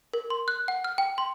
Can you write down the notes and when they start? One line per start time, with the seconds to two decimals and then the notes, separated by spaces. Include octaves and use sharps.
0.13 A#4
0.30 C6
0.48 F#6
0.68 F#5
0.84 F6
0.98 G5
1.18 C6